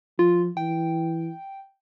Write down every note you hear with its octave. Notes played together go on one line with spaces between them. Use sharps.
F3 F4
E3 G5